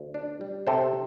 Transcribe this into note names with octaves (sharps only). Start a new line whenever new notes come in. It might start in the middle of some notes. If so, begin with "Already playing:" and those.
Already playing: D2
D4
G3
C3 A4 C5